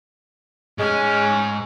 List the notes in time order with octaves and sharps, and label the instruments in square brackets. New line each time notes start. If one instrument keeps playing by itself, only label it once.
[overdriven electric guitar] G#2 G#5 [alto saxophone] G#3 [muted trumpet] C#4